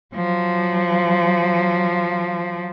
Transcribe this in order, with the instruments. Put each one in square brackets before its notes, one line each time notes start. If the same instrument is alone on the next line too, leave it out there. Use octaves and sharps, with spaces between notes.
[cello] F3 F#3